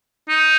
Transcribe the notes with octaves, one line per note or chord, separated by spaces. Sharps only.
D#4